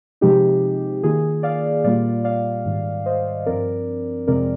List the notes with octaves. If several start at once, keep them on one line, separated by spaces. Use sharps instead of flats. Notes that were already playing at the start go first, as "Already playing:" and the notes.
C3 F3 G#3 D#4 G4
D#3 A#3 F4 G#4
D5 F5
A#2 G3 A#3 F4 D5 F5
D5 F5
G#2 D#3 G3
C5 D#5
G2 F3 C4 A#4 D5
F2 C3 F3 G#3 C4 A#4 D5